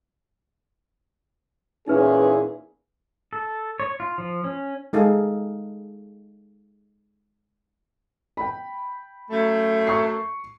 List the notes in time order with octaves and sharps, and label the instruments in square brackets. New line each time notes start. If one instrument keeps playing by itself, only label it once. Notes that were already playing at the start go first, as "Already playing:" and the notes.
[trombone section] E2 A#2 E4 [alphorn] C#4 [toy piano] D#4 B4 [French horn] G#4
[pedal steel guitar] A4
C#5
F4
F3
C#4
[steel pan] G#3 D#4 G#4 A4 F5
[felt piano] G5 B5
[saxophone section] F#2 A3
[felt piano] C#6 C7